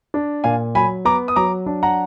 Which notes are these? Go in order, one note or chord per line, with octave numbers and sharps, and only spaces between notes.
D4
A#2 F5 G#5
F#3 G#5 B5
B3 A#5 D6
D#6
F#3 A#5 D6
D4
F#5 A#5